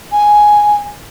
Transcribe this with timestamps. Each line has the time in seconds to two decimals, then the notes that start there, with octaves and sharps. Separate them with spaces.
0.12 G#5